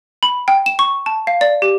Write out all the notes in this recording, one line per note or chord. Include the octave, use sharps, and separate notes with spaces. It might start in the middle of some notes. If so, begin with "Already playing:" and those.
B5
G5
E7
C#6
A5
F5
D5
G4